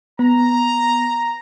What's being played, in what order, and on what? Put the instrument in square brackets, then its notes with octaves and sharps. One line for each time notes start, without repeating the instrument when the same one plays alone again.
[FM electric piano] B3 [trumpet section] A#5